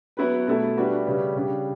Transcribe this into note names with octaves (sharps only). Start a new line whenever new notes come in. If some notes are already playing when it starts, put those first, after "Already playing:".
F#3 B3 E4 B4
B2 A3 E4 A4
G3 D4 F#4 B4
C#3 G3 C#4 G4 B4
C#3 G3 D4 G4